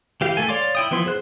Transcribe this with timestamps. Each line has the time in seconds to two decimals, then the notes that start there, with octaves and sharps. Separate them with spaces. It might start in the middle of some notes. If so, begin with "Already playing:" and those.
0.21 E3 G4 F5
0.37 E3 A3 A4 G#5
0.49 C#5 D5 F5 C6 D6
0.75 E4 G5 D#6
0.91 E3 F3 B3 E4 C6
1.06 G#4 C5 F#6